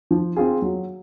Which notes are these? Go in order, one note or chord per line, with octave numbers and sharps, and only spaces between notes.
F3
C4 F4 G#4
F#3